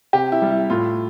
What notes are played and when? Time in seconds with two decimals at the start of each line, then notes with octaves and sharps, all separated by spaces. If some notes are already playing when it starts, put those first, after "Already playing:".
0.13 C3 G4
0.32 E4
0.42 G3
0.51 E4
0.70 A2 F4